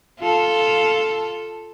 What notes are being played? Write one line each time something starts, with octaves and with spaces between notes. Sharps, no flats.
F4 A4